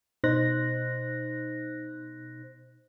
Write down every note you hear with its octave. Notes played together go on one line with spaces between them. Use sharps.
B2 D#4 C5 F#6 A#6